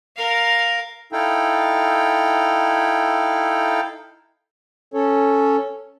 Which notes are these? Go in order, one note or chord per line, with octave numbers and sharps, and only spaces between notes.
A#4 F5
D#4 E4 A4 F5 G5
C#4 A4 C#5